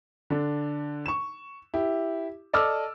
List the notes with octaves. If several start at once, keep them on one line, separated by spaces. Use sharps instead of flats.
D3 D4
C#6 E7
E4 G4
A4 D5 D#5 D6 E6 F6